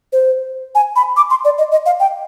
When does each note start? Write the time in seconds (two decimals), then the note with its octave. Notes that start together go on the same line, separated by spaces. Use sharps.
0.13 C5
0.75 G#5
0.96 B5
1.17 D6
1.30 C6
1.45 D5
1.58 D#5
1.72 D#5
1.86 F5
2.00 G5